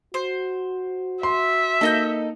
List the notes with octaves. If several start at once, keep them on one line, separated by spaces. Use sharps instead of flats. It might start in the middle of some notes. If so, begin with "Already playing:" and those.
F#4 C5
E5 C6
A#3 D#4 A4 D#5 G6